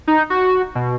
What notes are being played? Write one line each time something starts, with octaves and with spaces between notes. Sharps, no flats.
D#4
F#4
B2